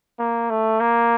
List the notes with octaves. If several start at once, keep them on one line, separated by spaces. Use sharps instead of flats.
A#3
A3
A#3